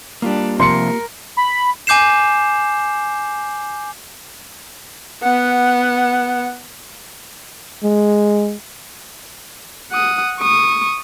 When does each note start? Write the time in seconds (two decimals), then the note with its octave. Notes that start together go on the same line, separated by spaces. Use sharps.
0.22 G3 A#3 D4 F4 G4
0.60 C3 F3 A#4 C6 C#7
1.37 B5
1.87 G#5 D6 G6 C7 E7
5.23 B3 F#5
7.84 G#3
9.92 F#5 D#6
10.40 C#6 D#6